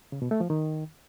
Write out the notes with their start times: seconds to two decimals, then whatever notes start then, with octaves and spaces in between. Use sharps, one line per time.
0.12 C#3
0.22 B2
0.31 A3
0.41 F3
0.50 D#3